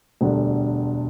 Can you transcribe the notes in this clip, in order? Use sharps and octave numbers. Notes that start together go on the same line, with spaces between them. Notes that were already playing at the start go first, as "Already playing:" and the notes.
E1 D2 D3 G3